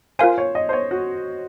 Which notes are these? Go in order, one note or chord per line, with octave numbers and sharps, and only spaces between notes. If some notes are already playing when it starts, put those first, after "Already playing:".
F4 A#4 C5 F5 G#5
C#5
D#5
C5
C#5
F#4